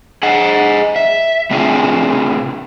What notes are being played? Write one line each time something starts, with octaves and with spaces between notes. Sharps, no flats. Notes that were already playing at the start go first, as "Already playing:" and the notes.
G#4 D#5 F#5
E5
A2 C3 C4 D4 F4 G#4